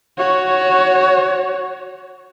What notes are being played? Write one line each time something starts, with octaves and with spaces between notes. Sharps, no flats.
F#4 C#5